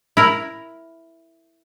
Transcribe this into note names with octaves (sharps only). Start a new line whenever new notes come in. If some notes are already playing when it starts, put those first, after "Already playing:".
E4 A#4